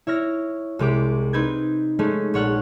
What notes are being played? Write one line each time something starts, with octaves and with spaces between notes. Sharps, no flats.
E4 C#5 F6 A#6
C2 G#3 G4 D6
C4 D#4 B4 G6 G#6
G#3 A3 C#4 D#4
A#1 C#5 F#5 F6